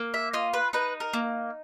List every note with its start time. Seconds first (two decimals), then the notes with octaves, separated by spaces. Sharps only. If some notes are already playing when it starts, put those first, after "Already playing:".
Already playing: A#3
0.14 E5
0.33 F4 D#5
0.53 B4
0.73 D#4 B4
1.00 A#4
1.13 A#3